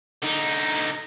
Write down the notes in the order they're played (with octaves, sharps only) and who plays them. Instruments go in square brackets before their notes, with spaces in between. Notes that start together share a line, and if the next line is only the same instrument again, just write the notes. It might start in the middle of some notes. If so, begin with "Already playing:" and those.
[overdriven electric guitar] D3 D#4